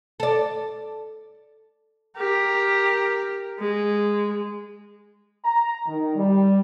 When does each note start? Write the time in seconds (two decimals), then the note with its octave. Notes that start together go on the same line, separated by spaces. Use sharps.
0.20 A4 D5
2.17 G4 A#4
3.59 G#3
5.45 A#5
5.86 D#3
6.16 G3